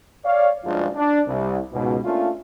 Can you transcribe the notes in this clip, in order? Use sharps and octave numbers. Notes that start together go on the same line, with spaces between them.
C#5 D5 F5
F#1 G2 F3 G#3 D4 F4
D4
C2
C#2 G#2 B2
A3 A#3 C#4 D4 F4